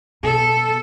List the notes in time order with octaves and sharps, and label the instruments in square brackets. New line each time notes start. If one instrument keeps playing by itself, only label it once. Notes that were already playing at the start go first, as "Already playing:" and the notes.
[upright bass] B2 [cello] A4